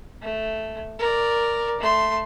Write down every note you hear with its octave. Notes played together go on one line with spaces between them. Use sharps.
A3
A#4 D5
A3 C6